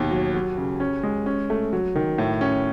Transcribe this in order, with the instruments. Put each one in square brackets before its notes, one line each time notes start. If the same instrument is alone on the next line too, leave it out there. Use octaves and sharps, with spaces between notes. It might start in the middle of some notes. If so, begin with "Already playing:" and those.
Already playing: [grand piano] D#2 B2
F#3
F#3
C#3
C#4
G#3
C#4
A3
F#3
D#3
A2
C#4